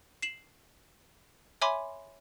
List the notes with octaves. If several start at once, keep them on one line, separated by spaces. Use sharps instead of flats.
C7 E7 F#7
C#5 E5 G#5 B5 C6 D6